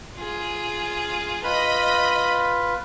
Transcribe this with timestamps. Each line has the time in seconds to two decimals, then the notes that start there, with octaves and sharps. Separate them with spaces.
0.15 F4 G#4
1.44 F4 B4 D#5 B5